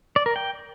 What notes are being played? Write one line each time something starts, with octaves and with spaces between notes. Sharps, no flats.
D5
A#4
G5